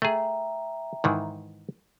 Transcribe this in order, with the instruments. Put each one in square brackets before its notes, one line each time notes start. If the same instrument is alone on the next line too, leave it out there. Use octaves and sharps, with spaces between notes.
[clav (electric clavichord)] A3 G#4 [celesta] E5 G5 A#5
[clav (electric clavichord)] G#2 D#3 E3